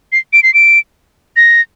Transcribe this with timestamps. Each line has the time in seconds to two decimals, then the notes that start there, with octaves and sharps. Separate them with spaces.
0.12 C7
0.33 D7
0.43 C7
0.54 D7
1.36 A#6